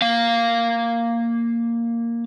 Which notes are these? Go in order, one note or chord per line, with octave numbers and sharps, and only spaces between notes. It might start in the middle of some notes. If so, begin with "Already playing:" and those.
A#3 F5